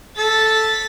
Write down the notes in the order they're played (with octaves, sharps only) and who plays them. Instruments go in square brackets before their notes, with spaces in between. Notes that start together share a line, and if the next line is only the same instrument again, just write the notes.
[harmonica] A4 [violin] A6 B6